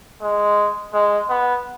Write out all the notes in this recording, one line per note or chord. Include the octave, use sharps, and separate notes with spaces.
G#3
G#3
B3